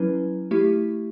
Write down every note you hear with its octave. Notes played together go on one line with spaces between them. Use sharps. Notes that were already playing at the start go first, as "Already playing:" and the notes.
Already playing: F#3 C#4 E4 B4
A3 E4 G4